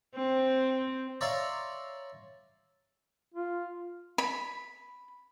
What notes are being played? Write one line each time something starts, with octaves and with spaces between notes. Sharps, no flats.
C4
C#5 D5 E5 F5 A#5 C6
F4
B5